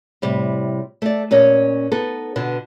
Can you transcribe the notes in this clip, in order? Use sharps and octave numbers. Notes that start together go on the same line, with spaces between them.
A2 C3 G3
A3 D5
A#2 C#4 C#5 D#5
B3 D#4 A4
B2 D3 B4